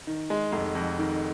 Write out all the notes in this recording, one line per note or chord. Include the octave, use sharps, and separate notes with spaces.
D#3
G#3
F1
F2
D#3